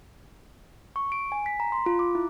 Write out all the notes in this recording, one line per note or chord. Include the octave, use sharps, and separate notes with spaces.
C#6
D7
G#5
B6
A#5
C6
F4
D6
E4